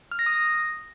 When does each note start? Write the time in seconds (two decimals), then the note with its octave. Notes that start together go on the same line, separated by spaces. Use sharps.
0.12 F6
0.19 A#6
0.26 D#6
0.34 A#6